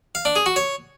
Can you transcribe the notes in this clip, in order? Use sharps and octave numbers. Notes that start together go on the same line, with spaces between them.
F5
D4
G#4
F#4
C#5